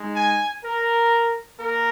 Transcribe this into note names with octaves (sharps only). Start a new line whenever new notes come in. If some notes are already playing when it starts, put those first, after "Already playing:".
Already playing: G#3 D#4
G#5
A#4
A#3 A#4